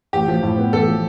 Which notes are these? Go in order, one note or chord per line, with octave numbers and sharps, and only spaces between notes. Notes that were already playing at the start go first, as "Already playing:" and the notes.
A1 G4
F3
A2
B3
A1 A4
F3